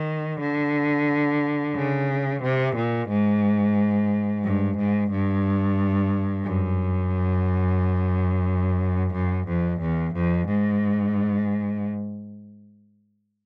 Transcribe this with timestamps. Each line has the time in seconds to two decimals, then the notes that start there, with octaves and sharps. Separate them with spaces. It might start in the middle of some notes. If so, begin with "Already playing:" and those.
Already playing: D#3
0.40 D3
1.75 C#3
2.42 C3
2.76 A#2
3.09 G#2
4.44 G2
4.77 G#2
5.11 G2
6.45 F#2
9.14 F#2
9.47 F2
9.80 E2
10.14 F2
10.48 G#2